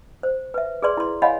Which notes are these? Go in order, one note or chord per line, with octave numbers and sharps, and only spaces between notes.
C5
B4 E5
G#4 B4 D5 C6
E4 C6
C#5 D#5 F5 F#5 G#5 B5